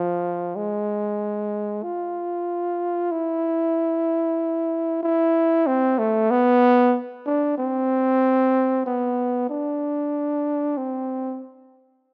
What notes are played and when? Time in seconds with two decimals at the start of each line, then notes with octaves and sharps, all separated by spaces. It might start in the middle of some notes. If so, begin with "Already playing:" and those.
Already playing: F3
0.56 G#3
1.83 F4
3.11 E4
5.03 E4
5.67 C4
5.98 A3
6.30 B3
7.26 D4
7.58 C4
8.86 B3
9.49 D4
10.77 C4